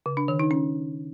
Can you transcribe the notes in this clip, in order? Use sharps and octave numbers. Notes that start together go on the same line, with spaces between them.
C#3
D4
D#3
D#4
C#4